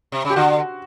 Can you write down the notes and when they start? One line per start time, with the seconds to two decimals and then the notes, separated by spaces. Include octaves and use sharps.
0.12 C3
0.25 C#3
0.30 G4
0.36 D3 F#4